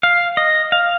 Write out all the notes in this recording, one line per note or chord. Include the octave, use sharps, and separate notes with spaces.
F5
D#5
F5